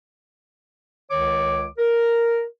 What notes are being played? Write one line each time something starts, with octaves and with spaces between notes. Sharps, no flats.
C#2 D#3 C#5 D6
A#4